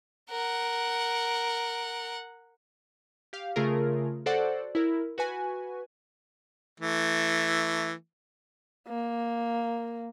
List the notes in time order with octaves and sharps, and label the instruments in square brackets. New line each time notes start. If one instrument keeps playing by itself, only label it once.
[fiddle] A#4 F#5
[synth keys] G4 F5
C#3 A3 F4 G#4 A#4
F#4 A4 C5 D5 F#5
E4 A#4
F#4 B4 G#5
[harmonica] E3 A3
[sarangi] A#3